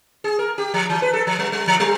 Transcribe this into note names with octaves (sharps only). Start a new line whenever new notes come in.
G#4
A#4
G4
F3
E3
B4
A4
F3
G3
G3
F3
G3